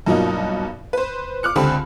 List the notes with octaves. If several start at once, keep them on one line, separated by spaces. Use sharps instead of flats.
G2 B2 F#3 A#3 D#4 F4
B4 C5
D6 F6 F#6 C#7
C#2 D3 C4 G4 A5 B5